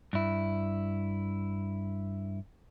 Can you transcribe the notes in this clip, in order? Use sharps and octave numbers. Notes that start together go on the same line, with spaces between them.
G2 E4